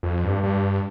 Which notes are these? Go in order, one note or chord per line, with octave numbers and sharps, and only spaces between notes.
F2
G2
G2